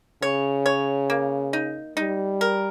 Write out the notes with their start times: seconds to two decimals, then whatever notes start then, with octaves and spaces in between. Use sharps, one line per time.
0.22 C#3 C#5
0.66 C#5
1.10 A#3
1.53 D#4
1.97 G3 D#4
2.41 A#4